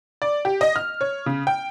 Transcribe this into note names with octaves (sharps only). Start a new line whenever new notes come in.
D5
G4
D#5
F6
C#5
C#3
G5